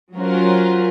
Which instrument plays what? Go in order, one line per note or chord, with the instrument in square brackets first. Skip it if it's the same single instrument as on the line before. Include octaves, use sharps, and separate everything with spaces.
[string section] F#3 C#4 F4 F#4 A#4 C5